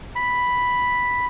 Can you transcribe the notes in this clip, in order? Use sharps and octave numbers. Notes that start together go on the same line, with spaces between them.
B5